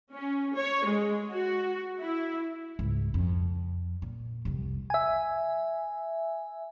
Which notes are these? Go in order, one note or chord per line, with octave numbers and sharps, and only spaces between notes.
C#4
C#5
G#3
F#4
E4
C#2 G#2
F2
A#2
C2 F2
E5 G#5